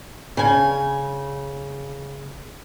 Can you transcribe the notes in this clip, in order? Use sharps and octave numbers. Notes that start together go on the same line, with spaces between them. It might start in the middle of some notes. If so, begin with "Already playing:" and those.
C#3 G#5